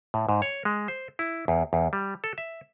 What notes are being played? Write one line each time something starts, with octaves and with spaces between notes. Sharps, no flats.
A2
G#2
C#5
G#3
C5
E4
E2
E2
G3
A4
E5